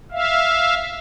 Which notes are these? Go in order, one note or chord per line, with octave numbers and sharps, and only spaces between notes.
E5 F5